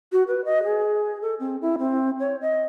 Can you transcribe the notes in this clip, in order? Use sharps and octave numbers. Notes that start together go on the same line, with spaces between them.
F#4
B4
D#5
G#4
A4
C4
E4
C4
C#5
D#5